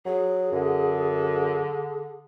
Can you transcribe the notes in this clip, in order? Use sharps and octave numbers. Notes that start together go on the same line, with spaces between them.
F#3 G#4
F#2 D3